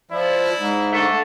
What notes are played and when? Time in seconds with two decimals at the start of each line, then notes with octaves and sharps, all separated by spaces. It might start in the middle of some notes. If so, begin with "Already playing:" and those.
0.11 F3 E4 D5
0.57 G#2
0.93 D3 A3